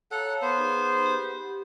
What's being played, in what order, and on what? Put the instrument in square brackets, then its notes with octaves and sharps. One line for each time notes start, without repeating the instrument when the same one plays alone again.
[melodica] A4 F#5 [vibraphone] C#5 F5 A#5
[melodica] B3 C5
[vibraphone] D#4 G#4
G4